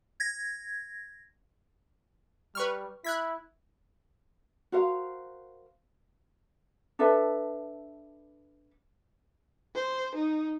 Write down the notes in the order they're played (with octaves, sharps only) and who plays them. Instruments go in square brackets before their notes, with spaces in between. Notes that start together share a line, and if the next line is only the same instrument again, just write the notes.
[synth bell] G#6 A#6
[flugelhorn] G3 [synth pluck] B4 C#6 F6
[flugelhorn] E4 [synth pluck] F#6 G#6 B6
[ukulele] F#4 A#4 C5 F5
D4 A4 B4 E5
[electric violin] C5
D#4